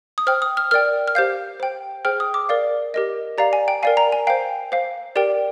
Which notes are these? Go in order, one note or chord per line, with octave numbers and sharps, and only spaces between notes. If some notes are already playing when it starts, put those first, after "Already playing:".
D#6
C5 G5 F6
D#6
F6
A#4 D5 G5 F6
F6
G4 C5 F5 G6
C5 G5
G#4 C5 G5 F6
D#6
D6
A#4 D5 F5
G4 A#4 D#5
G4 D5 F5 A#5
G#5
G5
A#4 D5 F5 G#5
A#5
G#5
C5 F5 G5
C5 F5
G4 A#4 D5 G5